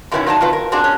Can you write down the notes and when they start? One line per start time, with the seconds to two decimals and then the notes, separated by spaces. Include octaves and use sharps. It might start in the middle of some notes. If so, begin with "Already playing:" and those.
0.11 F#2 B2 D#3 B3 C#4 E4
0.26 F3 F#3 D#4 D5 A5
0.41 D#3 C4 F4 B4
0.53 A#4
0.72 A#2 C4 D4 F#4 G#4
0.84 C#4